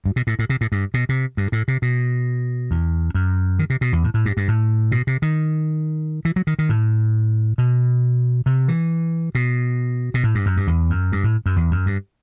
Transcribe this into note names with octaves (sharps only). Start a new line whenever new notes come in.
G2
B2
A2
A2
C3
A2
G2
B2
C3
G2
A2
C3
B2
E2
F#2
D#3
C3
B2
E2
A2
A2
G2
G2
A2
B2
C3
D#3
E3
F#3
D#3
D#3
A2
B2
C3
E3
B2
B2
A2
G2
F#2
G2
E2
F#2
G2
A2
F#2
E2
F#2
G2